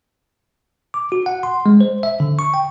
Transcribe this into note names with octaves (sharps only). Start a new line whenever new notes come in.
D6
F#4
F#5
C6
G#3
C5
E5
D3
C#6
G5